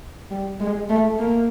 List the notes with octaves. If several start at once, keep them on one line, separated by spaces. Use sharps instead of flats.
G3
G#3
A3
A#3